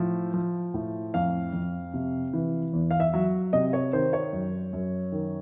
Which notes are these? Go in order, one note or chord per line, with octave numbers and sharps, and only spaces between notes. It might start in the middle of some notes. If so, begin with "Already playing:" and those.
Already playing: A2 F3
F3
A2
F2 F5
F2
C3
E3
E2
F5
E5
F#3
C3 D#5
C#5
D#3 C5
C#5
F#2
F#2
D#3